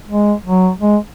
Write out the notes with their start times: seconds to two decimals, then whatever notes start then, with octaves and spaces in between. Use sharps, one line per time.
0.09 G#3
0.45 F#3
0.80 G#3